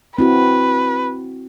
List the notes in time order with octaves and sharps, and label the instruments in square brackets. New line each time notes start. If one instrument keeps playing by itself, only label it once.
[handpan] C4 E4 F#4 [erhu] B4